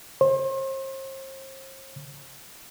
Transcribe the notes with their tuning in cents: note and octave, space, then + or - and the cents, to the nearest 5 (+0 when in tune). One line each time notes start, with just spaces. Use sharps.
C5 +40